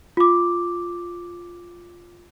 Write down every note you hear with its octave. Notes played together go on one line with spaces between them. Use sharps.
F4 D6